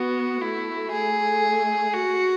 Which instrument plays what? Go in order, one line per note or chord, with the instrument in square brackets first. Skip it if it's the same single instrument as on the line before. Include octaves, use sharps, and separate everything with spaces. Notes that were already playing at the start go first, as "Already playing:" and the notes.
Already playing: [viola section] B3 [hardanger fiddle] F#4
[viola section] A3 [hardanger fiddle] E4
[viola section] A3 [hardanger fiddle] G#4
[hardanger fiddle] F#4